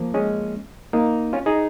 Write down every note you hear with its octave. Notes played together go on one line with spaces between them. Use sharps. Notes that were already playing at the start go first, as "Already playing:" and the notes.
Already playing: F3 A#3
G#3 C#4
A#3 D#4
C#4 F4
D#4 G#4